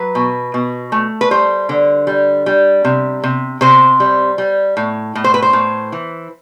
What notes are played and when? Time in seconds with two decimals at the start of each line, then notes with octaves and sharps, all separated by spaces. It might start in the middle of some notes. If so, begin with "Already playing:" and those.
Already playing: F#3 B4
0.15 B2
0.54 B2
0.92 A3
1.21 B4
1.31 G3 C5
1.69 D3
2.07 G3
2.46 G3
2.85 C3
3.24 C3
3.61 C3 C5
4.00 G3
4.38 G3
4.77 A2
5.15 A2
5.24 C5
5.34 B4
5.42 C5
5.53 A2
5.92 E3